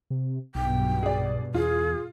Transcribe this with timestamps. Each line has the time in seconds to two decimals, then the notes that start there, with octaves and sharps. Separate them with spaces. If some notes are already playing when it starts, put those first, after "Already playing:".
0.11 C3
0.55 B1 G2 B2 G5
1.03 G#4 D5
1.54 E2 F4 G#4